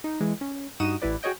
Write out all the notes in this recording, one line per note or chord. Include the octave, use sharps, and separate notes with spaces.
D#4
E3 G#3
C#4
G2 D#4 F#4 D#6 D#7 E7
A1 A2 E4 B4 D5
F#4 G#4 C#5 D#5 G5